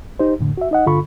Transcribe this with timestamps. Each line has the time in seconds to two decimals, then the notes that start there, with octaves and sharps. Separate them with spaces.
0.19 D#4 G4 C5
0.39 F2 A2 D3
0.57 F#4 E5
0.71 D#4 D#5 F#5
0.86 G2 D3 F4 A4 B5 C#6